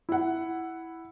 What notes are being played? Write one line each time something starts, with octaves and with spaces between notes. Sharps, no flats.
E4 F#5